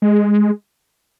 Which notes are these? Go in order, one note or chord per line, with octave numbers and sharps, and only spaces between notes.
G#3